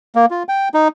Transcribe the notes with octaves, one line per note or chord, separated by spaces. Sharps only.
A#3
F4
G5
D#4